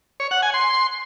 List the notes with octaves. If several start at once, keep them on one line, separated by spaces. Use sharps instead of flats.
C#5
F#5
G#5
C6